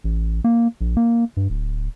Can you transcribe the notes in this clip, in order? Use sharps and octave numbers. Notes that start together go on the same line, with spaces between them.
A1
A#3
A#1
A#3
G2
D1